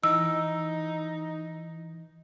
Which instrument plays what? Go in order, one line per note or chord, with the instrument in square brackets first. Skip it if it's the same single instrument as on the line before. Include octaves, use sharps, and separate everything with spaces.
[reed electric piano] E3 [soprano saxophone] D#4 [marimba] E6